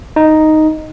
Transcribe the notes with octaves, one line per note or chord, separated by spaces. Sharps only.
D#4